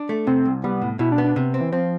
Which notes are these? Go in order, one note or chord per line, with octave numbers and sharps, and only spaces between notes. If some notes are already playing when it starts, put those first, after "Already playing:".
Already playing: D4
A3
C3 C4
C2
G3 B3
A2
B2 E4
D4
B3
D4
C3
C4
E3
F3 C4